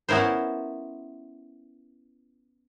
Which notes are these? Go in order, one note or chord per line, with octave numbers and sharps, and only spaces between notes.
B3 C#4 E4 A#4 C5